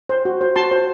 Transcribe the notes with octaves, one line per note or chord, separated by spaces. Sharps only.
C5
F#4
C5
F#4 A5 C6
C5